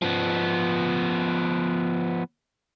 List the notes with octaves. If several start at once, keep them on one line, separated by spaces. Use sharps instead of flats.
F3 B3